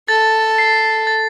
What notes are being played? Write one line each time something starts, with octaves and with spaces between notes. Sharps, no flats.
A4 A6
C7
A6